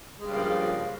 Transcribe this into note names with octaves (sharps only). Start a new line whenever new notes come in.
G2 C#3 F3 G#3 A#3